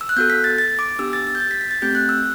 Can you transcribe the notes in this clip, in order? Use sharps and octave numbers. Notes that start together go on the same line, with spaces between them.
E6
F#6
B3 F#4 A4 G6
B6
A6
A6
D6
B3 D4 G4 E6
A6
A6
G6
A6
B6
B6
A6
A3 C4 G4 G6
F#6
E6